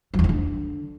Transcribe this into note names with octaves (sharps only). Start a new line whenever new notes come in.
F#3
E2
G2
D3